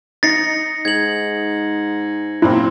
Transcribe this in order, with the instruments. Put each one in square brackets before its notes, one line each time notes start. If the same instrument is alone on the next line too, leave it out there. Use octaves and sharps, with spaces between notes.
[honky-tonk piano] D#4 [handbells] A6 [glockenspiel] A#6 C7 C#7
[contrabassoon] G#2 [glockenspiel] G#6 F#7
[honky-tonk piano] F#2 A#2 C4 [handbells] E4